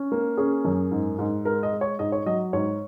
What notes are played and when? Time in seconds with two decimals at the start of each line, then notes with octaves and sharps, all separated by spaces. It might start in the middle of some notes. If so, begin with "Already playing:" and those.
Already playing: C#4
0.12 A#3
0.37 C#4 G#4
0.65 F#2
0.91 G#2
1.19 G#2
1.45 G#3 A#4
1.63 D#5
1.72 G#3
1.81 C#5
1.99 G#2 D#5
2.12 C#5
2.26 F#3 D#5
2.53 G#2 C#5